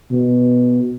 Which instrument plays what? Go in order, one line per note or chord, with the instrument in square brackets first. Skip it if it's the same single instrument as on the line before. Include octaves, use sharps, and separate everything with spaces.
[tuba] B2